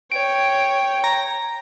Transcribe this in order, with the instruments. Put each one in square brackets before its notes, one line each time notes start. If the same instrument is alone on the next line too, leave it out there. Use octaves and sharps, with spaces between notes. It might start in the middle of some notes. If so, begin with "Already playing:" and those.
[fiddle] C#5 G5 [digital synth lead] D7
[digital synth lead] A#5